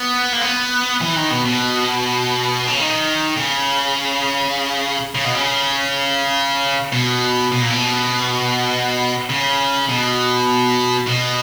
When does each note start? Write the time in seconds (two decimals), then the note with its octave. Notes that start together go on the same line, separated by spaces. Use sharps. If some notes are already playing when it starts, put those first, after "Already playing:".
Already playing: B3
0.33 A#3
0.41 B3
1.01 E3
1.15 D#3
1.30 B2
1.45 B2
2.67 C#3
2.78 D#3
3.37 C#3
5.15 C#3
5.25 B2
5.35 C#3
6.92 B2
7.52 B2
7.61 A#2
7.70 B2
9.30 C#3
9.89 B2
11.07 B2